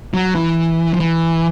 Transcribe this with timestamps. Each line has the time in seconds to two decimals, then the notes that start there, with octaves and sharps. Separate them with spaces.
0.14 F#3
0.35 E3
0.94 F3
1.00 E3